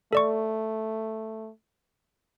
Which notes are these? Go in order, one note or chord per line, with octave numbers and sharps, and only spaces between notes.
A3 A4 D5 C#6